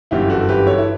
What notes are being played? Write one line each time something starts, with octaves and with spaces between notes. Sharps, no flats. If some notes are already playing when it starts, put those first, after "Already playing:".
G1 F#2 E3 E4 G4
F#4 A4
G4 B4
A4 C#5
E4